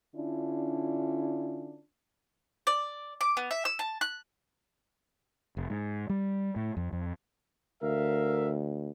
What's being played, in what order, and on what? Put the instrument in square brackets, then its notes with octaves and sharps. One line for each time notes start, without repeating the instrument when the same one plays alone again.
[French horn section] D3 C#4 D4 E4 F4
[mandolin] D5
D6
B3
E5
E6
A5
F#6
[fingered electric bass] F1
G#2
G3
A2
F2
F2
[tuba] D2 [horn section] A#4 E5 F5